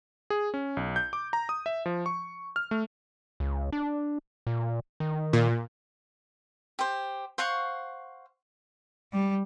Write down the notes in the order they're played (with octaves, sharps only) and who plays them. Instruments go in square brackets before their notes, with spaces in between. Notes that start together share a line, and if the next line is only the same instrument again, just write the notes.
[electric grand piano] G#4
C#4
B1
G6
D6
A#5
D#6
E5
F3
C#6
F6
A3
[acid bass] C#2
D4
A#2
D#3
[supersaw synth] A#2
[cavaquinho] G4 C5
C5 F5 F#5 C#6
[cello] G3